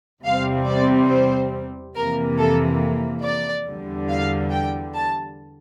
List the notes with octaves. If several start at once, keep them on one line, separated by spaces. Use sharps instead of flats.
E2 C3 G3 C4 F5
D5
C5
F2 C3 E3 A#3 A#4
A4
D5
E2 D3 G3
F5
G5
A5